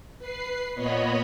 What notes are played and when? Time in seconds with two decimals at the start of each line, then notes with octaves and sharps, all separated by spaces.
0.19 B4 C7
0.75 A#2 B3 C#5 D#5 B5